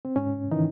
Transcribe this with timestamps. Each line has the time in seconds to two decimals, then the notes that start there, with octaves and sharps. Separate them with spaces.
0.05 C4
0.16 G#2 C#4
0.51 D#3 E3 D#4